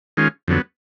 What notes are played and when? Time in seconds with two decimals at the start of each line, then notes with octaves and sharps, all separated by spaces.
0.17 D#3 G#3 C#4 F4
0.48 F2 D3 F#3 B3